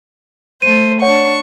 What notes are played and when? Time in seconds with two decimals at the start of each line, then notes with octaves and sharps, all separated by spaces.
0.62 A3 C5 D#7
1.02 D4 C#5 F#5 C#6